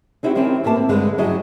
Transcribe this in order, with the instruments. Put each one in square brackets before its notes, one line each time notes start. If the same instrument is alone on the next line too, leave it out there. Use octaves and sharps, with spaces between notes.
[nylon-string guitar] C4 D#4 E4 F#4 G4
D#3 C4 C#4 E4 G4
A2 A#3 E4 B4 A5
C4
G2 D3 G#3 B4
G2 C#3 F#3 E4 G#4 D#5